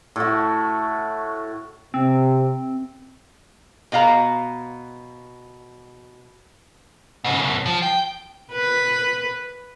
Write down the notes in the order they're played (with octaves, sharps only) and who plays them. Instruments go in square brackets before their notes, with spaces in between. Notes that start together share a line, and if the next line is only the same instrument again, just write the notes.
[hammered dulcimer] A2 F#4
[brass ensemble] C3 [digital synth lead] C4
[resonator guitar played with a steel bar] B2 F#4 F5 A#5
[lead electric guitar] G#2 C#3
B1 F#2
F3
G5
[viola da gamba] B4